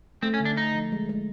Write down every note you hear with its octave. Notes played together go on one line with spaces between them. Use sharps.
A3 C4
C#4
D3
D4
D3 D#4
F3
G#3
G#3